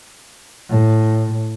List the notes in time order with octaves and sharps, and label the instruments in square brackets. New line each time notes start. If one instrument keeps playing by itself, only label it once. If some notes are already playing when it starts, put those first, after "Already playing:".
[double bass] A2